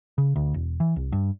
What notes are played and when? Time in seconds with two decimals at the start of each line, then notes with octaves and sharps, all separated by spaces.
0.18 C#3
0.36 D2
0.54 E1
0.80 E3
0.96 C2
1.12 G2